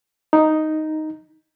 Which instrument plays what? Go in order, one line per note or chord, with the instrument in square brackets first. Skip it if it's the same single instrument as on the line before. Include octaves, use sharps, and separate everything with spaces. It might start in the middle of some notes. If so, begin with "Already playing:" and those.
[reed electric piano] D#4